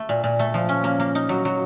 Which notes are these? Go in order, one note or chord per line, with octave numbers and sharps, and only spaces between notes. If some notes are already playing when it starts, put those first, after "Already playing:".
Already playing: A3
A#2
A#2
A3
F3
C#4
A#3
A#3
D#4
F#3
F#3